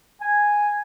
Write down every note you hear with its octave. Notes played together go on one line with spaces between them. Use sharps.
G#5